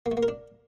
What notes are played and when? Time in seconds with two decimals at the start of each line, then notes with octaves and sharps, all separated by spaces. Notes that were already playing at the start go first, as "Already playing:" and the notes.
0.06 A#3
0.11 A3
0.17 A#3
0.23 A#4
0.28 D4